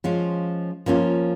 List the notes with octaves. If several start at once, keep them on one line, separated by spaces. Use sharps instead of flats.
F3 G#3 C#4 F4
F3 A#3 C#4 F4